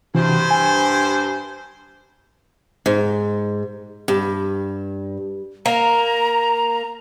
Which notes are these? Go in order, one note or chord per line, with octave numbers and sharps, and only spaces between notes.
G2 C3 E3 F#4 C5
G#5
G#2
G2
A#3 A#5